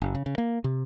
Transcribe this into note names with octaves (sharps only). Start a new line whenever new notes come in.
F#1
C#3
C#3
A#3
C3